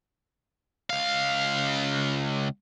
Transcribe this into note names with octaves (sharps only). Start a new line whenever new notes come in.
C#2 F5